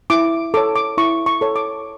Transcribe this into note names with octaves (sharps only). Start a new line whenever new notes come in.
E4 D6
A4 C#5 D6
D6
E4 C#6
C#6
A4 C#5
D6